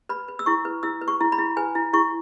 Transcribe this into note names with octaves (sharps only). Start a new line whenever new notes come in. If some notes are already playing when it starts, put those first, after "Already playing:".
B4 B5
B4
E6
E4 C#6
B4
E4 E6
B4
C#6
E4
B5
E4
B4 G#5
E4
E4 C#6